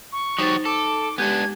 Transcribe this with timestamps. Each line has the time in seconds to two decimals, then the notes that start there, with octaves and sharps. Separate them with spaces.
0.12 C#6
0.39 F#3 D#4 G4 C5 A6
0.65 A4 D6
1.18 G#3 B3 D4 G4 G#6